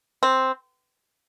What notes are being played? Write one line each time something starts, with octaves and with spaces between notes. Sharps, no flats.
C4